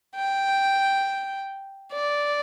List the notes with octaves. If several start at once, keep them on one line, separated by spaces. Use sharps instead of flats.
G5
D5